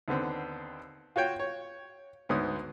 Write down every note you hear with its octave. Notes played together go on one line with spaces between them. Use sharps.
D#2 D3 B3 C4
F4 F#4 C#5 G5
C#5
D2 G#2 B3 C#5 D#6